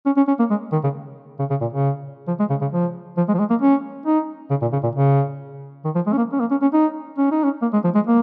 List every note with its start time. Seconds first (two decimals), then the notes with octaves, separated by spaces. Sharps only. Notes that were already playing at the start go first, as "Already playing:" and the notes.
0.06 C#4
0.17 C#4
0.28 C#4
0.39 A#3
0.50 G#3
0.73 D#3
0.84 C#3
1.39 C#3
1.50 C#3
1.61 A#2
1.73 C#3
2.28 F3
2.40 G#3
2.50 C#3
2.61 C#3
2.72 F3
3.17 F3
3.28 G#3
3.34 F3
3.39 G#3
3.50 A#3
3.62 C#4
4.06 D#4
4.50 C#3
4.62 A#2
4.73 C#3
4.83 A#2
4.96 C#3
5.85 D#3
5.95 F3
6.07 G#3
6.13 C#4
6.18 A#3
6.33 C#4
6.40 A#3
6.51 C#4
6.62 C#4
6.74 D#4
7.18 C#4
7.32 D#4
7.44 C#4
7.62 A#3
7.73 G#3
7.84 F3
7.95 G#3
8.07 A#3